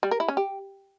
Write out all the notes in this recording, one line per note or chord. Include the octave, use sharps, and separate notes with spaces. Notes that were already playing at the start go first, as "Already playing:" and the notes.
G3
A#4
E4
C#4
G4